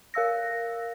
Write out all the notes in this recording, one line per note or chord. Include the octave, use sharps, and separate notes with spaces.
A#4 F5 E6 A#6